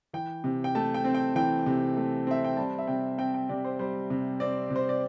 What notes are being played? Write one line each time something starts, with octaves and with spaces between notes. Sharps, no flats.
E3 G5
C3
G5
A3 A5
G5
C4
G5
E3 G5
C3
A3
C4 E5
G5
G3 A5
E5
C3 G5
C4 G5
G5
C3 D5
C5
G3 C5
C3
C4 D5
C3
C5
D5